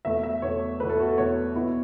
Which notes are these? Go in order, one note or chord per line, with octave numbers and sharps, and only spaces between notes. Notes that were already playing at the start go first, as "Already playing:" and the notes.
E2 B2 A3 E5
E5
E2 B2 A3 C#5
E2 B2 A3 B4
A4
F#4
A4
E2 B2 A3 C#5
B2 B3 E4